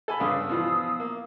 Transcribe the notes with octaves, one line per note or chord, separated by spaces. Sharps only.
A4 F#5 G#5 B5
G2 C#3 D4 F5 D#6 E6
B2 E3 F3
A#3